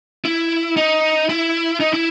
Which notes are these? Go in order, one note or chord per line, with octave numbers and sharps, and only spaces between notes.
E4
D#4
E4
D#4
E4